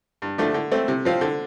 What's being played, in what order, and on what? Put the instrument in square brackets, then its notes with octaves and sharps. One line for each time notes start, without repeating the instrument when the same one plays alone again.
[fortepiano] G2
D3 F3 A3 D4
D3
A3 C4
C3
F3 C4 F4
D3